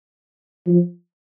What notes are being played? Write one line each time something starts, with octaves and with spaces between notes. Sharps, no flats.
F3